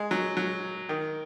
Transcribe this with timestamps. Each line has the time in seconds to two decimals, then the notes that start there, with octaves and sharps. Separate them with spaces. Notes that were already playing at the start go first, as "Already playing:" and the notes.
Already playing: G#3
0.11 F#3
0.37 F#3
0.89 D#3